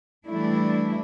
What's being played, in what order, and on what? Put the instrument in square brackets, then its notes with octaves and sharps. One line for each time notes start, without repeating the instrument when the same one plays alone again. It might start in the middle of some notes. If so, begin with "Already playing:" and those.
[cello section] E3 G3 A3 D4 E4